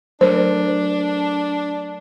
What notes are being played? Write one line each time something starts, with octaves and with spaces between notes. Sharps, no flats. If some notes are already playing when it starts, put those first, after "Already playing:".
F#3 A3 D4 A#4 C5